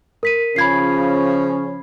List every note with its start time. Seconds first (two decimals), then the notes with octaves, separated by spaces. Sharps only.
0.23 A#4 B6 D#7
0.56 C#3 F3 C#4 B5 G#6 C7